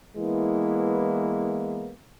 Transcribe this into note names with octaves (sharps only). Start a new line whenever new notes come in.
E3 G#3 A#3 B3 E4